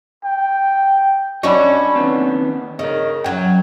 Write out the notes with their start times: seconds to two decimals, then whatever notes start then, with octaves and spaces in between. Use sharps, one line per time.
0.24 G5
1.43 C#4 D4 F#4 D#5 B5
1.96 D#2 B3 C4
2.79 C#3 A#4 D#5
3.24 F#2 F#3 G5